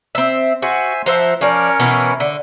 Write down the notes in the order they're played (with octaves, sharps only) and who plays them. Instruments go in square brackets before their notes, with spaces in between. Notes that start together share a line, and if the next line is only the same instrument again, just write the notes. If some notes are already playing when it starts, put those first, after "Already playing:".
[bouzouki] C4 E5
[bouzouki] F#4 [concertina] C5 E5 G#5
[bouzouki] F3 C5 E5 [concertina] F#5 A#5
[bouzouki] F3 D5 [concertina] C#4 A#4 C#5
[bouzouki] B2 E3 A#5
D3